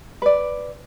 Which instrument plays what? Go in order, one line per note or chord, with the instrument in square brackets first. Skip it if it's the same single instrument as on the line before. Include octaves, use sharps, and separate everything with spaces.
[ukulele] B4 D5